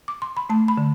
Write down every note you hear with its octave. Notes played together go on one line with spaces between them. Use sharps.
D6
C6
B5
A3 A5
B5
D3